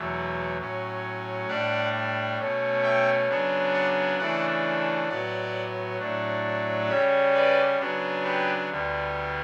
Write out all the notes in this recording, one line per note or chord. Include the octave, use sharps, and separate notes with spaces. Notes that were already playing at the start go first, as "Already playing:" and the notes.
Already playing: E2 B2 F#3 A3
A2 F#3 C#4
A2 G3 D4 D5 F#5
B2 A3 C#4
E5 G5
C#3 F#3 B3 D4
D5 F#5
C#3 E3 A3 D4 D5 F#5
A2 F#3 B3 D5 F#5
A2 F#3 A3 D4
C#3 G3 C#4 C#5 E5
B4 D5
C#3 F#3 B3 D4
G4 B4
D2 D3 G3 B3